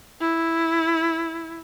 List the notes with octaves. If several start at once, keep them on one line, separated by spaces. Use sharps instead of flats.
E4